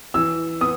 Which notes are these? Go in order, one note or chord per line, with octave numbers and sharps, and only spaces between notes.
E3 E6
B3 D#6